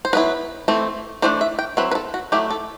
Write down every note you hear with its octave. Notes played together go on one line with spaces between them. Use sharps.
C5
F#3 B3 E4 B4
E3 A3 C4
E3 A3 D4 C5
E5
G5
F#3 C4 E4 B4
B4
A4
F#4
F#3 A3 E4 G4
A4